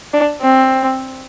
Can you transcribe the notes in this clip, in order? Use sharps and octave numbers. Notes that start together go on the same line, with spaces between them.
D4
C4